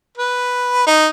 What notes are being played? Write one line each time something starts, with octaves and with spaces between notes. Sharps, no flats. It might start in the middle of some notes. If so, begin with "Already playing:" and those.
B4
D#4